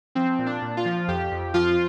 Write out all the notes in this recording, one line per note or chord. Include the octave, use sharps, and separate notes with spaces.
F3 C4
A#2
D4
A#2
F4
F3
F2 G4
F2
F3 F4